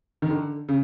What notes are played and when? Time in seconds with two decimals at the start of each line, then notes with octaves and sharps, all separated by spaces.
0.22 D#3
0.30 D3
0.69 C#3